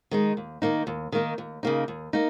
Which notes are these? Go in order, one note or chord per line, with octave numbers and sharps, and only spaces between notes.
D#3 G#3 D#4
D#2
D#3 A#3 D#4
D#2
D#3 A#3 D#4
D#2
C#3 A#3 D#4
D#2
A#3 D#4